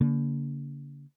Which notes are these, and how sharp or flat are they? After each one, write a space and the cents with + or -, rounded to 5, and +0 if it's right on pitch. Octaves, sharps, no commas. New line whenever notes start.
D3 -40 A#3 +0